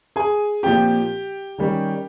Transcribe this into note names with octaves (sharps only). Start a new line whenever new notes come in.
G#4 G#5
A#2 F3 C4 G4 G5
D#3 G3 C#4